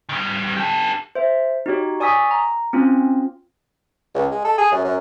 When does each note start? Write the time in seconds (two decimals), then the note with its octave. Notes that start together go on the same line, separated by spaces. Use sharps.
0.09 D#3 G3
0.57 G4 A4
1.15 C5 E5
1.66 D#4 F#4 G4 C#5
2.00 D5 G#5 C#6 D#6 E6 B6
2.31 A#5
2.73 C4 C#4 F4
4.15 C#2
4.31 G#3
4.44 A4
4.58 G#4
4.72 F#2
4.84 F#2